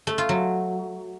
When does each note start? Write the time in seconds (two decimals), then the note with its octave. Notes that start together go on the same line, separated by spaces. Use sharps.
0.07 A3
0.18 F4
0.29 F#3